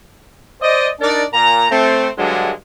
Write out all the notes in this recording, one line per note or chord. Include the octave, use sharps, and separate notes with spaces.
C5 D5 D#5
D4 D#4 A#4 D5
A#2 A#5
A3 C4
G2 D3 F#3 G#3